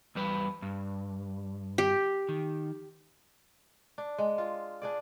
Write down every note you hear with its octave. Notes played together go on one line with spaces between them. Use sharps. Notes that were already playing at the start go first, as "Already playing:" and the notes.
E2 G3 B4
G2
G4
D#3
D4
G#3
F4
D4 G#4 D5